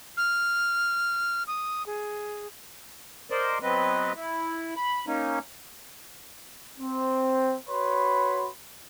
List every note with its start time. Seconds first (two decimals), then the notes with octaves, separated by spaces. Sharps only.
0.17 F6
1.47 D#6
1.86 G#4
3.30 A#4 C5 D5 D#5
3.62 F#3 B3 C4 B4 D#5
4.16 E4
4.76 B5
5.07 A#3 C#4 D#4
6.79 C4
7.69 F#4 B4 C#5 B5 C6